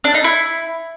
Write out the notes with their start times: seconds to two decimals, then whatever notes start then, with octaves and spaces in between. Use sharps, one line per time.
0.04 D4
0.14 D#4
0.24 E4